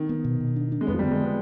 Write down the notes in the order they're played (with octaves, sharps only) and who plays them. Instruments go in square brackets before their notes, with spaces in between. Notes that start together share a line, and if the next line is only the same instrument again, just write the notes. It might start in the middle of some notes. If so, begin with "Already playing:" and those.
Already playing: [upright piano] D#3
[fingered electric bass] B3
B2
B2
D4
D4
[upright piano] G#3
[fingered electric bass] F2 [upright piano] B3
[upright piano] F3
G3
[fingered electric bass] D3
[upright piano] G#3
B3